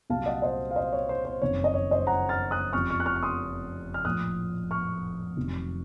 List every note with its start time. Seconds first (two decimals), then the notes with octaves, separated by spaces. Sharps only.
0.10 C2 A#2 F#3 F5 A5
0.26 D#5 F#5
0.42 C5 D#5
0.71 F5
0.76 C5 D#5
0.93 C#5
1.09 C5
1.25 C5
1.41 F#1 F2 D#3 C#5
1.64 D#5
1.74 C#5
1.91 C5 D#5
2.07 F#5 A#5
2.29 F6 A6
2.51 D#6 F#6
2.73 F1 F2 C3 F3 C#6 F6
2.90 C#6 F6
3.00 F#6
3.06 C#6 F6
3.16 F6
3.23 C6 D#6
3.94 F6
4.05 A#1 A2 F3 D#6 F#6
4.71 C#6 F6
5.37 F1 F2 D#3 F#3